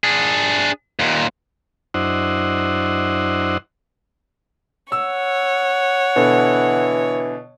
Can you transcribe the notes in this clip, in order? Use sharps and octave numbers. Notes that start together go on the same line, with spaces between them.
D4 G#4
D#2 A#2
F#2 D4 E4 C5 D#5 F#5
C#5 F#5 E6
B2 D3 E3